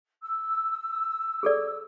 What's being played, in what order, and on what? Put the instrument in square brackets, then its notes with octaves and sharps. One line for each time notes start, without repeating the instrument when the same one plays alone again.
[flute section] E6
[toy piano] G#4 A4 D5